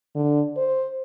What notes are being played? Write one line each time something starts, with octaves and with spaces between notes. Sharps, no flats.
D3
C5